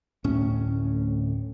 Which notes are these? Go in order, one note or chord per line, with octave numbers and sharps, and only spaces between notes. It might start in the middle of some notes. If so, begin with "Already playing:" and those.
D1 A2 C#4